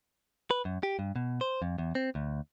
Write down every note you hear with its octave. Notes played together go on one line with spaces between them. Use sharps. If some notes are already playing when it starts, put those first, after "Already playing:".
B4
F#2
G4
G2
B2
C5
F2
E2
C4
D2